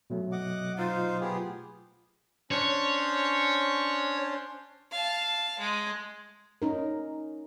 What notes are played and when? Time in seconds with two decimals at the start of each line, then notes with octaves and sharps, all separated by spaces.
0.10 B2 F#3 A3
0.32 D#5 F#5 D6
0.78 D#4 F4 C5 F5
1.21 B3 G4 G#4
2.51 C#4 D4 C5 C#5
4.91 F5 A5
5.59 G#3
6.62 C#4 D#4 A#4